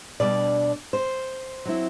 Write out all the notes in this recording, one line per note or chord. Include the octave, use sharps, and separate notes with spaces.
B2 G3 D4 D5
C5
F#3 C4 E4